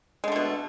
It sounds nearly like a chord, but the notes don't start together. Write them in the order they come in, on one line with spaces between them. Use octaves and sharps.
G#3 D3 A3 B2